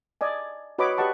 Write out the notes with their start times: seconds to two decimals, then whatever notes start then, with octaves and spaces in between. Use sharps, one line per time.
0.21 D5 D#5 G#5
0.78 F#4 B4 C#5 D#5 B5 D6
0.97 G4 B4 D#5 F#5 A5 C#6